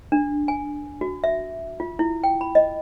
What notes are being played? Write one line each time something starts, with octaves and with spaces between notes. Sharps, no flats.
D4
G#5
F#4
E5
F4
E4
G5
B5
D#5